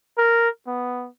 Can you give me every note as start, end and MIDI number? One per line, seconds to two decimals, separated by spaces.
0.18 0.49 70
0.67 1.08 59